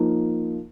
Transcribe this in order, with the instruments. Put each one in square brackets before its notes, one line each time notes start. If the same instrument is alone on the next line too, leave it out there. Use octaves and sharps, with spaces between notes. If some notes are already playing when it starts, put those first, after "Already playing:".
Already playing: [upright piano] F3 A#3 D#4